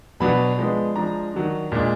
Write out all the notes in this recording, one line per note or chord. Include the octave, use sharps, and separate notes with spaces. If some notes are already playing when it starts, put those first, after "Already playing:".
B2 F#3 B3 D4 B5
F3 G#3 B3 D4
F3 G#3 D4 A#5
D#3 F#3 D4
A#2 G#3 D4